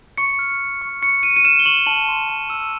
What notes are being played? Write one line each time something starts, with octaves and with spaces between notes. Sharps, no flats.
C#6 C#7
F6
F6
C#6
C#6 C#7
F6 D#7
D#7
F6 E7
G7
C#6 F#7
A5 F#7
C6
A5
E6